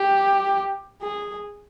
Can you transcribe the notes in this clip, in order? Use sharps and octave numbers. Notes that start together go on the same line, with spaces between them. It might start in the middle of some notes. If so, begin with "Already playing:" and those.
Already playing: G4
G#4